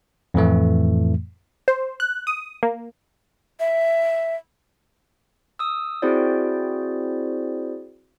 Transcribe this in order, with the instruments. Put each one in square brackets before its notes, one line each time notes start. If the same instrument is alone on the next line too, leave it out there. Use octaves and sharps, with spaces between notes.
[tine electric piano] F2 A2 E3 A3
[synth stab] C5
F#6
D#6
A#3
[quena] E5
[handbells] D#6 E6
C4 E4 F#4 G#4 C5 D5